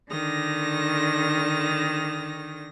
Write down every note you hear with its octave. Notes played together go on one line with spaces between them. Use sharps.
D3 D#3 A#6